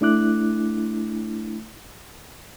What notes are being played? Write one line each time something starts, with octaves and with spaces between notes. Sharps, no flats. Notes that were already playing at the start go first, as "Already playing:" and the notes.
A3 D4 E4 D6 F#6